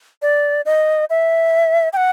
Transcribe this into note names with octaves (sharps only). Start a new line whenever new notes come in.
D5
D#5
E5
G5
F#5